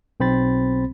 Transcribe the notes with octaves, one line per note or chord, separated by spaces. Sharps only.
B1 C4 C5 B5 A6